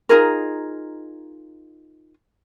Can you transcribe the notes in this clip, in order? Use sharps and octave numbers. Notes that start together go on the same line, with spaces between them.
D#4 F4 G#4 A#4